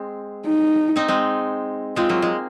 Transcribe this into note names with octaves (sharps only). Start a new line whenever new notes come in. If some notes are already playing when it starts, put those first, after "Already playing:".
Already playing: G#3 C4
D#4
C4 D#4
G#3 C4
G#3 C4 F4
F#3 A#3
G#3